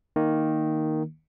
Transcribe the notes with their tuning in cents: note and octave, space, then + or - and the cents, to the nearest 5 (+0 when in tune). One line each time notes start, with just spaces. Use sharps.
D#3 +0 A#3 +0